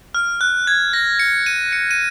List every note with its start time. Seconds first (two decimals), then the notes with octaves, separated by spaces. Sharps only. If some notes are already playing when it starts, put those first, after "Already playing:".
0.15 F6
0.41 F#6
0.67 G#6
0.93 A#6
1.19 C#7
1.46 D#7
1.73 C#7
1.91 D#7